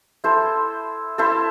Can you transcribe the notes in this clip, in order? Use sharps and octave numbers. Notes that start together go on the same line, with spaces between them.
E4 A4 C5
E4 A4 C5